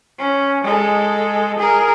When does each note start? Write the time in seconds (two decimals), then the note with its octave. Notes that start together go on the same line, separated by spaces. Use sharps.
0.18 C#4
0.64 G#3 A4
1.59 G#4 A#4